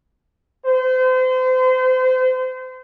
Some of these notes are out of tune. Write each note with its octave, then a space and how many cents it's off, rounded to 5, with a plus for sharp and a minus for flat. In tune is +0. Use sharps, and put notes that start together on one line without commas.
C5 -35